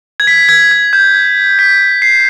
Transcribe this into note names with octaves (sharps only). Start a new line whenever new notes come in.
G#6
B6
G#6
G#6
G6
G#6
B6
C7